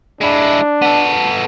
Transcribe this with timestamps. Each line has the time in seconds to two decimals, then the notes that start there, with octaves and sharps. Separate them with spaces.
0.21 G#3 D4 E4
0.82 B3 A4